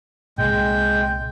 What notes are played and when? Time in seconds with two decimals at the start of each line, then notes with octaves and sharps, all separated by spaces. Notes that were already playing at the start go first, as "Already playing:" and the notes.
0.38 C2 A#2 G#3 G5